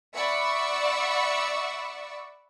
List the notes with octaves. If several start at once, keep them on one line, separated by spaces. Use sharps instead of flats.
D5 E5 F#5 B5 C#6 E6